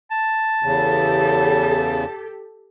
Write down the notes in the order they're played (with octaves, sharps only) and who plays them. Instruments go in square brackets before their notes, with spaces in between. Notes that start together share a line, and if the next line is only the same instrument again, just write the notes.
[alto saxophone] A5
[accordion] E2 C#3 [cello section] G4 A4